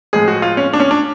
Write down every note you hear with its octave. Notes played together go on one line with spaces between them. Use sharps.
A2 F3 G#3 G#4
F#4
F4
C#4
D4
C#4
D4